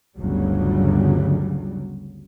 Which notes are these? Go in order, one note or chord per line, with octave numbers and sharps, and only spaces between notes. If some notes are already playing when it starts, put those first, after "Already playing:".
G1 D2 C#3 F#3 G3